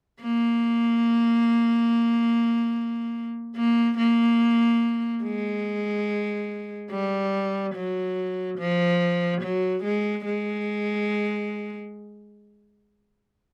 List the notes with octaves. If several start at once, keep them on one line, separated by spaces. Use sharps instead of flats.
A#3
A#3
A#3
G#3
G3
F#3
F3
F#3
G#3
G#3